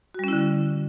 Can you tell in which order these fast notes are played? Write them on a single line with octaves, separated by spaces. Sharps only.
F#4 G3 C#4 E4 D3